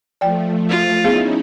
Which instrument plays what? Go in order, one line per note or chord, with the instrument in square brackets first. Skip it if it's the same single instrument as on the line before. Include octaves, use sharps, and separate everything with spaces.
[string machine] F3 A3 [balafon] D5 G5
[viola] F4
[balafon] B3 G#4 F5 [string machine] C#4 D#4 E4